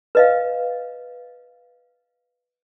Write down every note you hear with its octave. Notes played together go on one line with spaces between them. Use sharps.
B4 D#5 F5